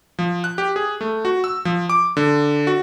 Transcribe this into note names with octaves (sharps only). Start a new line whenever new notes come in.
F3
F#6
G4
G#4
A3
F#4
E6
F3
D6
D3
F#4